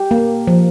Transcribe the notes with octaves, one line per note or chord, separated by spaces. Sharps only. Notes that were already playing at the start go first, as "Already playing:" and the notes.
Already playing: G4
A#3
F3